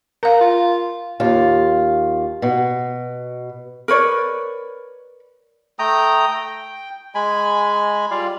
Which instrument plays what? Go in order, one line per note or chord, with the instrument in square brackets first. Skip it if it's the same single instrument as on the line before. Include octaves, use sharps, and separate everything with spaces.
[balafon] A#4 F5 [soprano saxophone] A#5
[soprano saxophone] F4
[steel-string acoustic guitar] D#2 F4
B2
[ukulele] A#4 B4 C#5 D5
[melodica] A3 G5 A#5 D#6
G5
G#3 G#5 B5
G3 F4 D5 F5